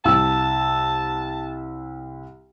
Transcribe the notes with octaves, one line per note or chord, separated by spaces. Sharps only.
C2 A5 E6